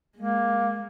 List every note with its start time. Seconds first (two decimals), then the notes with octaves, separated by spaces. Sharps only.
0.17 G#3 A#3